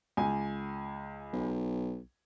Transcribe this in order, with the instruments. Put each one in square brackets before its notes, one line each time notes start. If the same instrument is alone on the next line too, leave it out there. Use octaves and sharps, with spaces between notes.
[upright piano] C#2 G#5
[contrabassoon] B1